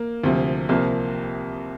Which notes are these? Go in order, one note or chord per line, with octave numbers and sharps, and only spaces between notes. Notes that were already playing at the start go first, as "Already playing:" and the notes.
Already playing: A#3
D2 C3 F3
C2 C3 F3 A#3